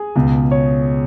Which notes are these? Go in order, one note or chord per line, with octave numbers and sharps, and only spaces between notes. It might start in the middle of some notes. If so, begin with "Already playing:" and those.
Already playing: G#4
C#2 B2
C#5